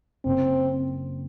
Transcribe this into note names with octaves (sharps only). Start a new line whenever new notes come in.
F#1 C4